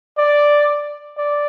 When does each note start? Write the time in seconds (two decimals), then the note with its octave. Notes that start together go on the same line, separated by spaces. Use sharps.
0.18 D5
1.17 D5